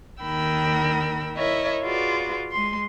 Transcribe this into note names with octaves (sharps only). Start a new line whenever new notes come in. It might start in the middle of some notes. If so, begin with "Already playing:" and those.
D#2 D#3 A#4 G5 B5 E6
E4 A#4 C#5 D#5 E5
F4 F#4 G#4 B4 D5
G#3 C6